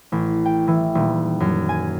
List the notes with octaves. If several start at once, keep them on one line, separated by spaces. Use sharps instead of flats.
A1
G5
E3
D#1
F#2
G#5